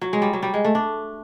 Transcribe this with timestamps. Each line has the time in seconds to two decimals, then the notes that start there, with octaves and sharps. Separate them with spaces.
0.01 F#3
0.13 G#3
0.22 G3
0.33 F#3
0.43 G3
0.54 G#3
0.65 A3
0.75 D4